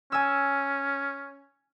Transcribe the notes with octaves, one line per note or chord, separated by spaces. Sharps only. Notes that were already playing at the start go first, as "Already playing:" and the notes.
C#4 G#5 E6